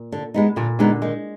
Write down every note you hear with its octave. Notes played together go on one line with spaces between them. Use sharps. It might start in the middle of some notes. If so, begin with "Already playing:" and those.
Already playing: A#2
D3
G#3 B3 D#4
A#2 D3
D3 G#3 B3 D#4
D#3 G#3